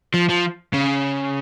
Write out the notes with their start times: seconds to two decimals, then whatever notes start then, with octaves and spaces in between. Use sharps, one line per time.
0.14 F3
0.29 F3
0.74 C#3